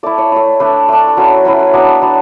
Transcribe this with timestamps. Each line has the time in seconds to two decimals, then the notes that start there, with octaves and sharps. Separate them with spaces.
0.03 A3 E4 D5
0.18 C#5
0.32 A3 E4
0.60 A3 D4 B4
0.88 A3 D4
1.08 A4
1.17 F#3 C#4 E4 B4
1.45 F#3 C#4 E4 B4
1.60 B4
1.73 F#3 B3 D4
2.02 F#3 B3 D4